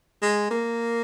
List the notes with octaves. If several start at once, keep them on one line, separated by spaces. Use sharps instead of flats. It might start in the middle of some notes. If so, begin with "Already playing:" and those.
G#3
A#3